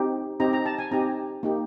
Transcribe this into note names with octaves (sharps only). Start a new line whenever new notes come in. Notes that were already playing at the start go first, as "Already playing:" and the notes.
Already playing: C4 D#4 G4
C4 D#4 G4 A#5
A#5
A5
G#5
C4 D#4 G4 A#5
A#3 D#4 G4